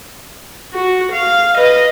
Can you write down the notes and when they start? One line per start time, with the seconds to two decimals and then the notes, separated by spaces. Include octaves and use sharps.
0.73 F#4
1.12 F5
1.57 B4 D#5